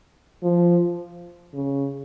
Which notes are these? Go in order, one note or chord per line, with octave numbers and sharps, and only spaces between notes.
F3
C#3